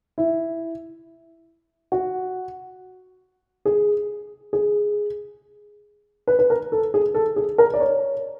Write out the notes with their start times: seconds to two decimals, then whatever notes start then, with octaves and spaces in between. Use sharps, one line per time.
0.18 E4
1.92 F#4
3.65 G#4
4.53 G#4
6.27 B4
6.39 B4
6.50 A#4
6.72 A4
6.94 G#4
7.15 A4
7.36 G#4
7.58 A#4
7.74 D5
7.80 C#5